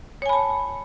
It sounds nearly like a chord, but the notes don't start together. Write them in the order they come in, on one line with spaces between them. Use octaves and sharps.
C#5 G#5 B5 A5